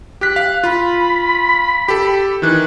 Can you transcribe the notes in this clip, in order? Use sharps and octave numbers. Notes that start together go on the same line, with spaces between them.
G4 F#6 B6
F5
F4 B5
G4 A4
D#3 E3 F#6